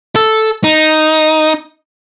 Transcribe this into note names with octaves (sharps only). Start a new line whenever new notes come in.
A4
D#4